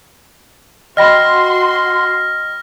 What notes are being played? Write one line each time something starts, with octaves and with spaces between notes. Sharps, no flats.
F#4 D#5 G5 B5 C6 F6 A#6